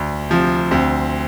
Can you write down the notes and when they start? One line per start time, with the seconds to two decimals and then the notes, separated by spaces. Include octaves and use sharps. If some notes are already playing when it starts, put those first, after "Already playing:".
Already playing: D2
0.29 C3 F3
0.71 D2 C4